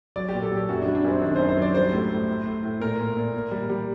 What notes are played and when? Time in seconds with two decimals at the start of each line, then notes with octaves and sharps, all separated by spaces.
0.16 F#3 D5
0.29 A#2 G4
0.42 A4
0.51 F#3 G4
0.69 F#2 F#4
0.82 D4
0.87 G3
0.95 D4
1.04 F#2 C4
1.21 D#3 D4
1.36 F#2 C5
1.49 C5
1.57 F#3 D5
1.74 G3 C5
1.93 A2
2.10 A2
2.28 A2
2.45 A2
2.63 A2
2.80 A#2 A#4
2.99 A#2
3.17 A#2
3.34 A#2
3.51 G3
3.70 G3